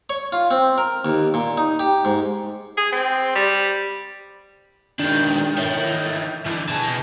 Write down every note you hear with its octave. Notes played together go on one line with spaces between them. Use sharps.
C#5
F4
C4
A#4
D#2
A#2
D#4
G4
G#2
G#4
C4
G3
D#3 G#3 D4
C#5 E5
D#3 E3
B1 D3 E3
B2 E3 G#4 A5